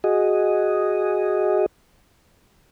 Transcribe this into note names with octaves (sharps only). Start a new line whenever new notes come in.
F#4 G#4 D#5